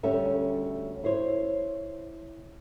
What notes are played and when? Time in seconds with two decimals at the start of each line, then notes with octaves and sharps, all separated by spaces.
0.03 D2 G3 C#4 A4 E5
1.04 E4 C5 C#5